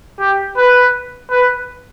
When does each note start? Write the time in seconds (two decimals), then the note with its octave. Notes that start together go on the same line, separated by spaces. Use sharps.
0.19 G4
0.57 B4
1.31 B4